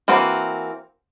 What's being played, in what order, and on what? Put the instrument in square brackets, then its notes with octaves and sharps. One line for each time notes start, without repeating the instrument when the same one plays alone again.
[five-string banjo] E3 A#3 C4 F#4